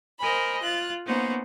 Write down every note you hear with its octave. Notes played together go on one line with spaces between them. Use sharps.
A#4 C5 D#5 G#5 B5
F4 F#6 A6
A#3 B3 C#4 D#4 C5 F#5